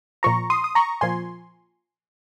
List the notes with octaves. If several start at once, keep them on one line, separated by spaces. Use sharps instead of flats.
A#2 F3 A#5 C#6
C6 D#6
D#6
A#5 C#6
A#2 F3 G#5 C6